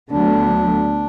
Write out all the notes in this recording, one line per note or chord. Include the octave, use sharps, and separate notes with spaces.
D2 D3 F#3 B3 D4